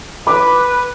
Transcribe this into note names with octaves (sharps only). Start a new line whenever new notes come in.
B4 B5 D6